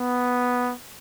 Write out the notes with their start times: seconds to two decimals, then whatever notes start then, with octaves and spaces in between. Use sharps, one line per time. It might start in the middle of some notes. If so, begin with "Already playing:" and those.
Already playing: B3